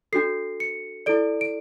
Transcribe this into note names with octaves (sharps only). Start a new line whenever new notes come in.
D4 F#4 A4 C7
C#7
E4 A4 D5 D7
D7